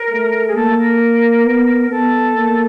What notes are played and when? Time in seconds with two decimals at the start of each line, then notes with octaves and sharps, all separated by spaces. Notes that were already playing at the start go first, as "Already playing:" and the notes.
Already playing: A#4
0.10 A3
0.47 G#4
0.55 A#3 A4
0.78 A#4
1.44 B3
1.89 B3 A4
2.35 A#3